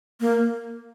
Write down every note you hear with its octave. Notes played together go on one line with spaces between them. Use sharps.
A#3